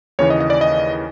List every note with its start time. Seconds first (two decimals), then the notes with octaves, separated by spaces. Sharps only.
0.19 D#2 C#3 E3 C#5
0.30 D#5
0.40 D#5
0.50 D5
0.61 D#5